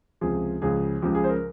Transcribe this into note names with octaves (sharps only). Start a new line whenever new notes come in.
C#2 C3 F3 G#4
C#2 C#3 F3 G#4
C#2 C#3 F3 G4
G#4
C5
A#4